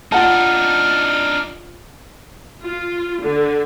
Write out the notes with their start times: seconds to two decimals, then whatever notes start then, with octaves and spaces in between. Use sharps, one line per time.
0.12 D4 D#4 F4 F#5 A5 F6
2.63 F4
3.19 D3